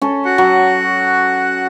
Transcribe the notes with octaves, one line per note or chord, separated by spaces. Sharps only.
C#4 A4
F#4 F#5
F#3